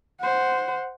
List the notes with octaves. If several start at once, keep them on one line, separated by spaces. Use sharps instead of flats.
C5 F#5